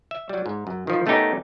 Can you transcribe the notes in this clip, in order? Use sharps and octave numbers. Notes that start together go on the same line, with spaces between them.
E5
F#3 G3
G#2
F#2
D#3 F3
D#3 A3 B3 C#4 D#4 G4